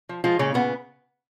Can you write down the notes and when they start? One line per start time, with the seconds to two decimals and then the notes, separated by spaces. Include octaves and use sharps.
0.09 F3
0.24 F3 G#3 F4
0.39 A#2 C#3 C#4
0.54 C#3 B3